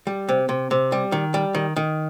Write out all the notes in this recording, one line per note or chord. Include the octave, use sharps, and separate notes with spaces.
G3
C3
C3
C3
G3
D#3
G3
D#3
D#3